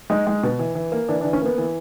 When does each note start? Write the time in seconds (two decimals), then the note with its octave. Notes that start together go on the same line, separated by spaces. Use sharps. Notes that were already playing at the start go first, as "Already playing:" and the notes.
0.10 G#3 D#4
0.27 G#3
0.43 B2
0.59 E3
0.75 E3
0.92 A#3
1.08 E3 D4
1.21 D4
1.24 E3
1.33 C#4
1.42 A#3 B3
1.58 E3